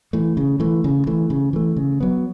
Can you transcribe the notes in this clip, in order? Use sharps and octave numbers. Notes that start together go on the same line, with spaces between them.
E3 A3
C#3
E3 A3
C#3
E3 A3
C#3
E3 A3
C#3
F#3 B3